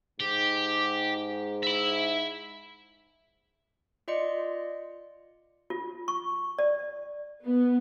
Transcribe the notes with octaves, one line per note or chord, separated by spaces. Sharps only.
G#2 G4
E5 B5
F4 D5 D#5 C6 C#7
F4
C#6
D5
B3